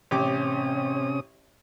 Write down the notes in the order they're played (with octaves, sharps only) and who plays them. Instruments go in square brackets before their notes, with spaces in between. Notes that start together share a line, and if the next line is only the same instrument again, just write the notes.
[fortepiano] A1 G4 D6 [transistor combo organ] C3 C#4 D#6